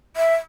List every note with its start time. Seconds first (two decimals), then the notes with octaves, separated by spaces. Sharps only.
0.16 E5